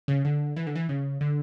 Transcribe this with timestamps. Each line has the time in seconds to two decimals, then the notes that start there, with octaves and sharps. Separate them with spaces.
0.08 C#3
0.25 D3
0.56 E3
0.67 D3
0.76 E3
0.89 C#3
1.21 D3